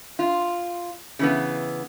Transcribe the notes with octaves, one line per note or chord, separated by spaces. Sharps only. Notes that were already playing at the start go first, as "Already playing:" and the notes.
F4
C#3 E3 B3